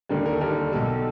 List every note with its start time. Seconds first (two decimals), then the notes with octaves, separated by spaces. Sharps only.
0.09 D#2 D3 G3 A#4
0.26 A#4
0.33 A4
0.41 D#2 D3 G3 A#4
0.72 B1 B2 G3 A4